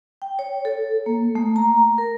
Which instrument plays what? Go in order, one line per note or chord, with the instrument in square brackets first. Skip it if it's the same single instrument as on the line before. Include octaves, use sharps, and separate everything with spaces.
[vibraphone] G5
C#5
A4
A#3
A3
A#5
A#4